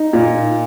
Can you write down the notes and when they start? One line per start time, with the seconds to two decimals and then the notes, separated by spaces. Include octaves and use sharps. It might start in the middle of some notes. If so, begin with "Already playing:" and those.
Already playing: D#4
0.13 A#2